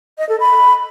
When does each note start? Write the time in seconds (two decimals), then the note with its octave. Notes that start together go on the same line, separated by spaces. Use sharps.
0.18 D#5
0.29 A4
0.40 B5